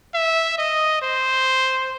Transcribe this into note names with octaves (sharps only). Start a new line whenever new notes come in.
E5
D#5
C5